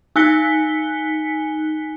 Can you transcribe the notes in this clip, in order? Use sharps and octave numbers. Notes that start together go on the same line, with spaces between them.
D#4 G#5 F#6 B6 C#7 G7